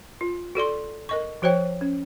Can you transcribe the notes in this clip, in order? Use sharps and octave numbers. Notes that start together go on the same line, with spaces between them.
F4
F#4 A4 D5 C6
A#4 D#5 C#6
F3 F#4 C5 C#5 G5
C#4